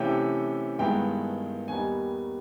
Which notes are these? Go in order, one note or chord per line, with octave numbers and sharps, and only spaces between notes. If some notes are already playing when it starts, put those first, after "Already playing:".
Already playing: C3 E3 A3 C#4 G5
G2 D#3 G#3 B3 E4 G5
D#2 D#3 G3 B3 D#4 G#5